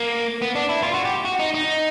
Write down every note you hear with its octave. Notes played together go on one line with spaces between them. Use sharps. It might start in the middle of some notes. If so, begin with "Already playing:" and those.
Already playing: A#3
B3
D4
E4
F4
F#4
G4
F#4
D#4
D#4